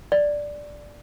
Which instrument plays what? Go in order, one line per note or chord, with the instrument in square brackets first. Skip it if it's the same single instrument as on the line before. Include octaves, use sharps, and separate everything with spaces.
[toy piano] D5